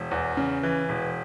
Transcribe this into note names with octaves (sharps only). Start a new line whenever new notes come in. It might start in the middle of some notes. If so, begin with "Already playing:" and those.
Already playing: E1
E2
C#3
E3
E1